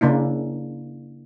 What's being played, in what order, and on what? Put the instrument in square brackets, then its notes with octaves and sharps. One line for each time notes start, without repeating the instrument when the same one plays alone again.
[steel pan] C#3 A#3 D4 E4